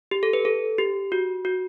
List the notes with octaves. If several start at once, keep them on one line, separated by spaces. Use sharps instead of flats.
G4
A4
B4
A4
G4
F#4
F#4